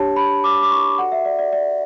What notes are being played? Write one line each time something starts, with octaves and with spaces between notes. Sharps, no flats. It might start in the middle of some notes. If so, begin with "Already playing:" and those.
Already playing: D4 G4 C#5 A5
B5
D6
D6
C#6
F#4 A4 D5 F#5
E5
D5
D5
D5